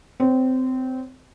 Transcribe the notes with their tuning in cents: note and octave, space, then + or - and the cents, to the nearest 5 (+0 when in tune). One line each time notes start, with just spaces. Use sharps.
C4 -20 C#5 +0